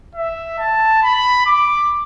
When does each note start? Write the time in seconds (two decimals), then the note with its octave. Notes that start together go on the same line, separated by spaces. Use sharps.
0.15 E5
0.59 A5
1.03 B5
1.46 D6